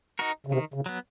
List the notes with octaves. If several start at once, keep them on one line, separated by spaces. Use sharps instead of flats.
D#4 F#4 A#4
C#3
C3 D#3
C#3
F#3 B3